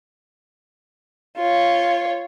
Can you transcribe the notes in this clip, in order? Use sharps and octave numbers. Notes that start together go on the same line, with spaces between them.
F4 C#5